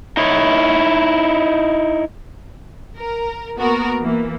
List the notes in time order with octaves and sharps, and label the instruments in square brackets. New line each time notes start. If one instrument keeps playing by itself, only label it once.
[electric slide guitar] D#4 E4 C#5
[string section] A#4
A#3 B3 F#4 A#4
E3 A#3